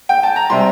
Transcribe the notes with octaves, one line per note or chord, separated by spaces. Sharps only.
G5
A5
A#5
C3 G3 C6